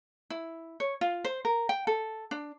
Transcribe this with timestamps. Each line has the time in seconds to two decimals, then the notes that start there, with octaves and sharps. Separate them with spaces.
0.30 E4
0.80 C#5
1.01 F4
1.25 C5
1.45 A#4
1.69 G5
1.87 A4
2.31 D4